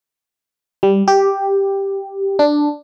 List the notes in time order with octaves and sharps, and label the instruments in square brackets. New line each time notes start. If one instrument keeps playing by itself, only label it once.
[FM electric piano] G3
G4
D4